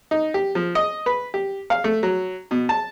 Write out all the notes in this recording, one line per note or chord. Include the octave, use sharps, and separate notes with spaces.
D#4
G4
F3
D#5
B4
G4
F5
A3
F#3
B2
A5